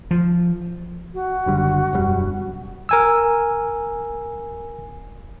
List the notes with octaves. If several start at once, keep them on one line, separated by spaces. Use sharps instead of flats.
F3
F#4
F#1 D3 G3
E1 F#2 G3
A#4 G#5 E6